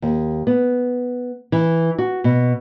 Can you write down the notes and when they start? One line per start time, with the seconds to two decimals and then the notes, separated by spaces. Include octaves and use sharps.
0.02 D#2
0.47 B3
1.52 E3
1.98 F#4
2.24 B2